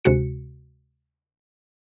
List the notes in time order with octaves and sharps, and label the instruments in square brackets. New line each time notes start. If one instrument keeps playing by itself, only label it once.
[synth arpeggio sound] D2 C3 G#3 F#4 C#7